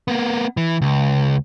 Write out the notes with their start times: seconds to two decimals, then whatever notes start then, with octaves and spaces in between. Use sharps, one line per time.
0.08 A#3 B3
0.57 E3
0.81 C#2